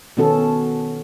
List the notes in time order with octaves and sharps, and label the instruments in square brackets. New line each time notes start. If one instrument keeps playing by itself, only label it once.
[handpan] B2 D#3 B3 C#4 F#4 A4